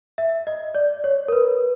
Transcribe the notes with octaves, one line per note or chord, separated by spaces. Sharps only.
E5
D#5
D5
C#5
A#4
B4